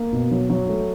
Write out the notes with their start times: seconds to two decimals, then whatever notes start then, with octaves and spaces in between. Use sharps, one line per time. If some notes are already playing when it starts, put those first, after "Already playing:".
Already playing: A#3
0.12 B2
0.31 F#3
0.50 F#3
0.69 A3